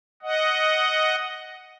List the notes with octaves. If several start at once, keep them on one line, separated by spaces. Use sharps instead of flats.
D#5 F#5